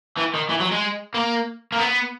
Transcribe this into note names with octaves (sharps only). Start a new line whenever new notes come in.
E3
D#3
E3
F#3
G#3
A#3
A#3
B3